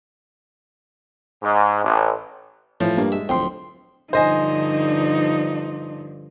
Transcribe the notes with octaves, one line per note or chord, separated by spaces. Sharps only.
G#2
A1
A2 E3 F3
G2 A#3
G#3 E5
D1 F2 G5 C6
G2 D3 F3 D#4 C5 D#5 G#5